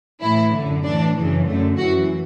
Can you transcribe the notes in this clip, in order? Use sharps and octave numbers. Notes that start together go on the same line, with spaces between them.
A2 E3 E4
F#2 D3
A2 E3 D4
F#2 C#3 E3
F#2 D3 A3
F#2 E3 F#4